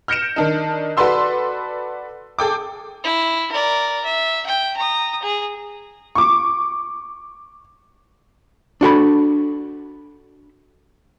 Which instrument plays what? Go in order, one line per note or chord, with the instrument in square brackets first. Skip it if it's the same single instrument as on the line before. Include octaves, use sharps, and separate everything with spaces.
[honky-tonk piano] F6 G6 A#6 C#7 D7 E7
D#3 D4 D#4
F#4 A4 B4 D5 C6 E6
G#4 A4 G5 D6
[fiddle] E4
A#4 D5
E5
G5
A#5 D#6
G#4
[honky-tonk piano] C#6 D6
[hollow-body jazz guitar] D4 F#4 A4 B5